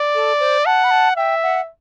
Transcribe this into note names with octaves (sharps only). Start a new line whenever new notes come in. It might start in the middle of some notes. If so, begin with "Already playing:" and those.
Already playing: D5
A4
C5
F#5 A5
B5
A5
E5 G5
F#5